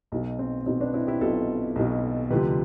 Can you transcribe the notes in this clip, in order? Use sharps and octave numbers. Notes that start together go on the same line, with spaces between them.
B1 B2
C4
B1 B2 C4
B3 D4
C4 E4
E4 G4
B1 B2 F4 A4
B1 B2
D2 C3 F3 G4 B4